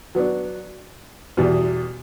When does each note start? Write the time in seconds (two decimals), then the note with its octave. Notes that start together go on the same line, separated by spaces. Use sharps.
0.15 F#3 B3 D4
1.37 E2 B2 G3